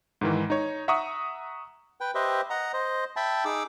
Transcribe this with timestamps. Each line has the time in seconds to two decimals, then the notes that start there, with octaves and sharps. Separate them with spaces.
0.21 G#2 D#3 E3
0.50 D#4 C#5
0.88 E5 F#5 A#5 C#6 D#6
2.01 B4 G5
2.15 G4 B4 C5 D#5 E5
2.50 D#5 F#5 A#5
2.73 C5 D#5
3.16 E5 G5 A5 B5
3.45 D#4 G#4 D6 E6